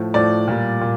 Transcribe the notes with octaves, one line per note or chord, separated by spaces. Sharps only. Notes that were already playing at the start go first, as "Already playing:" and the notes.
Already playing: A2 F3
A2 F3 D5
A#2 G3
A#2